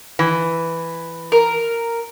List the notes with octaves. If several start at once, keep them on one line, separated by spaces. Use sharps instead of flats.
E3
A#4